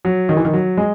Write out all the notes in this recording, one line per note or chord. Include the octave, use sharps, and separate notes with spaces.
F#3
D#3
E3
D#3
F#3
G#3